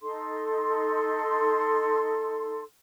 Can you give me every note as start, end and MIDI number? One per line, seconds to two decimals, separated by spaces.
0.01 2.63 63
0.01 2.63 69
0.01 2.63 84